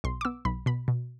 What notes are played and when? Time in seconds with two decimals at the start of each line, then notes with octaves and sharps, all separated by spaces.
0.04 B1 C6
0.21 D6
0.25 B3 E6
0.45 B1 B5
0.66 B2 B5
0.88 B2